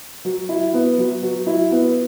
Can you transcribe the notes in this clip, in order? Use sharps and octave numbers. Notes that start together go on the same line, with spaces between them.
F#3
E4
B3
F#3
F#3
E4
B3